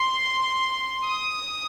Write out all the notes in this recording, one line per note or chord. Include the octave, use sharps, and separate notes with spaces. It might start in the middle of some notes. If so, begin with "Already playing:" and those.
Already playing: C6
D#6